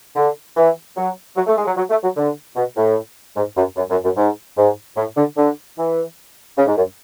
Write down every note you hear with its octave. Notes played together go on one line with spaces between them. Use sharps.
D3
E3
F#3
F#3
A3
G#3
F#3
F#3
A3
F#3
D3
B2
A2
G#2
F#2
F#2
F#2
F#2
G#2
G#2
A2
D3
D3
E3
C#3
G#2
F#2